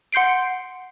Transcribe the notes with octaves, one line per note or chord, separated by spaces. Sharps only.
F#5 C6 G6 C7 D7